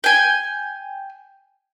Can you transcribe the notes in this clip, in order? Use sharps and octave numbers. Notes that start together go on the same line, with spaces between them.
G5 G#5